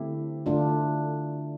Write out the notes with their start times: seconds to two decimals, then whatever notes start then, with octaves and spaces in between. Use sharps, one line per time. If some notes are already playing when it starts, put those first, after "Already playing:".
Already playing: D3 A3 C4 E4 G4
0.46 D3 A3 D4 F4